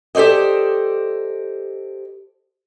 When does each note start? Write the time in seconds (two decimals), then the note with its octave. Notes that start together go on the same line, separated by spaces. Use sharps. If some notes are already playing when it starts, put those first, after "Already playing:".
0.15 G4 A4 C5 D5 D#5